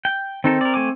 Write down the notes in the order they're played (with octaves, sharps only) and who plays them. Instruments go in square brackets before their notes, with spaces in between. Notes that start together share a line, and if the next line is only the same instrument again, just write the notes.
[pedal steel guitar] G5
[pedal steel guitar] D#3 D#4 A4 [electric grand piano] C4
[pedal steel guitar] A#4 D5
A3 G#5 D6